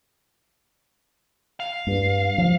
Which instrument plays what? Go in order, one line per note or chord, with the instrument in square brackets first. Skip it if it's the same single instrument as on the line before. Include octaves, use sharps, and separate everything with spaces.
[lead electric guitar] F5
[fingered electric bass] G2
F3